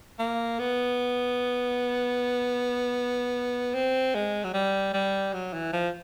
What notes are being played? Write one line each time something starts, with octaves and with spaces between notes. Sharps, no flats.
A#3
B3
C4
G#3
F#3
G3
G3
F#3
E3
F3